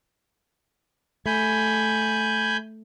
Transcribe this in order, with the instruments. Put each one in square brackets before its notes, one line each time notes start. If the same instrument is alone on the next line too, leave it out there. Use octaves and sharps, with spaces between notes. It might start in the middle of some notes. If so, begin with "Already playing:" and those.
[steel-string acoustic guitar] A3 [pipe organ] G#5 B5 G6